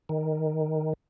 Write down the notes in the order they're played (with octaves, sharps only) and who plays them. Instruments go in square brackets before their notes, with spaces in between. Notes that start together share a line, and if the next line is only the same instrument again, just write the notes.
[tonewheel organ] D#3